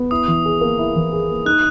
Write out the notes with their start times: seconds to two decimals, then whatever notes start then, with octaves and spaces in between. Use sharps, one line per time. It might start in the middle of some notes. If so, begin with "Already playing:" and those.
Already playing: B3
0.11 E4 D#6
0.28 E3
0.45 G#4
0.61 A#3
0.79 E4
0.96 E3
1.13 G#4
1.29 A#3
1.46 D#4 F#6